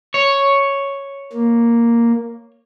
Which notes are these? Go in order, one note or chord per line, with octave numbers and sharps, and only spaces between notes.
C#5
A#3